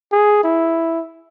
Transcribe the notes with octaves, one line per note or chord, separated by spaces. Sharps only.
G#4
E4